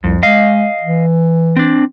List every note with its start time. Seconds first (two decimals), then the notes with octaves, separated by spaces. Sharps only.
0.04 C2 F2
0.23 G#3 D#5 F5
0.83 E3
1.56 C4 D4